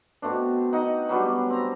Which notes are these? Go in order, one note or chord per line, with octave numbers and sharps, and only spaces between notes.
B2 A3 C4 D4
D#4 D#5 F#5
F#3 G3 B3 D4
C4 A#5